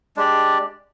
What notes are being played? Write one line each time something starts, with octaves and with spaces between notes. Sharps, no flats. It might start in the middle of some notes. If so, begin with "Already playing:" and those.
G#3 D4 G4 D5